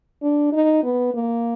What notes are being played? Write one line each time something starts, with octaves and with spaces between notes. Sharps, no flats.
D4
D#4
B3
A#3